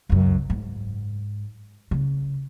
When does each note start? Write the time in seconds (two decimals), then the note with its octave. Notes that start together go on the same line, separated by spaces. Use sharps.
0.09 C#2 F#2
0.50 G#2
1.91 C#3